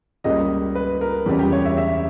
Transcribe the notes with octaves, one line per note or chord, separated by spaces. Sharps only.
C#2 C#3 G3 A#3 C#4 D#5
B4
A#4
E2 C#3 G3 C#4
G4
C#5
E5
E5